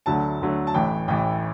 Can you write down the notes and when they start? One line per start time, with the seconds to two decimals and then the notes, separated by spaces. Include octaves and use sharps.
0.06 D2 D3 F#3 A3 A5
0.40 D2 D3 F#3 A3
0.67 A5
0.74 A1 A2 E3 G5
1.08 A1 A2 E3 G5